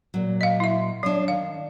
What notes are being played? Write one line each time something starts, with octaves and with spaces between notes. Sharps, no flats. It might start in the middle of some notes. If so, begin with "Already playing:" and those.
A#2 F#3
D#5 F5
E4 E5
F#3 D4 C#5 D#5
D#3 F5